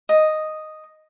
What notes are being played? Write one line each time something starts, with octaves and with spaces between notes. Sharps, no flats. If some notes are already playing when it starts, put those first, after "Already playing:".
D#5